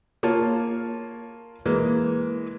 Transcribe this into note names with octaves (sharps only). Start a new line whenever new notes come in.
A#3 F4 C#5 A5
E3 G#3 A#3